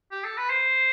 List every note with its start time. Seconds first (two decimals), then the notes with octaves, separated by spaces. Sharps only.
0.11 G4
0.24 A4
0.37 B4
0.50 C5